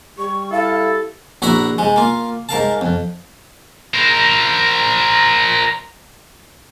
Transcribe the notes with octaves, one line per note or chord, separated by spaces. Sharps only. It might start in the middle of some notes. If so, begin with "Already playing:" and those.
G3 C#6
E4 A4 F5
A#1 E4 F#4 E5 F#5 A#5
G#2 G#3
A#3 F4
G#2 A#4 F5 A5
F2
A#4 C5